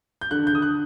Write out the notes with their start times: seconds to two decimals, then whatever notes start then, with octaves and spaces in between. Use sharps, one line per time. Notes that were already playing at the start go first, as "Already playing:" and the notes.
0.21 G6
0.31 D3 F#6
0.47 G6
0.53 D3 D#6
0.62 F#6